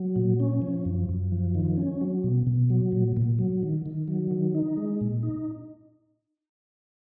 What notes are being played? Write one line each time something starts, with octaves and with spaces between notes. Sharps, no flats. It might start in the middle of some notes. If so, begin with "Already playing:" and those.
Already playing: F#3
A#2
C#4
F3
F#2
F#2
F3
D#3
C#4
F#3
B2
B2
F#3
A#2
A#2
F#3
D#3
D#3
F#3
D#3
D#4
G#3
A#2
D#4